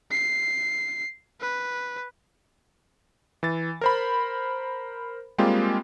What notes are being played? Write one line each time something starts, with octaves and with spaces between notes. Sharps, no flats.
C7
B4
E3 A6
A#4 C5 B5
G3 G#3 A#3 C4 F4 G4